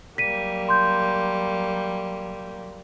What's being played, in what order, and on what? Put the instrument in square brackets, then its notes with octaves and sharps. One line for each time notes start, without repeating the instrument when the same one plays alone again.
[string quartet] F#3 G3 A#3 [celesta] B6 D#7
[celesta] C6 G6